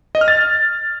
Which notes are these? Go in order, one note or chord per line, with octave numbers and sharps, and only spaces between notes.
D#5
F6
A6